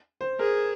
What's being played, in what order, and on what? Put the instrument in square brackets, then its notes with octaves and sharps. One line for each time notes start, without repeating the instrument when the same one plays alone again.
[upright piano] C5
[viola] G#4 [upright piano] A#4